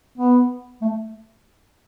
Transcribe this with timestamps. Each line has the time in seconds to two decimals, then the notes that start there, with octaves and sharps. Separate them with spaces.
0.18 B3
0.82 A3